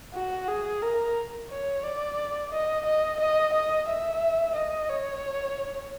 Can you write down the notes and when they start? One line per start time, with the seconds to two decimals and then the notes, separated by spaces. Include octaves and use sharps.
0.14 F#4
0.48 G#4
0.82 A#4
1.50 C#5
1.83 D5
2.52 D#5
2.85 D#5
3.20 D#5
3.53 D#5
3.88 E5
4.55 D#5
4.89 C#5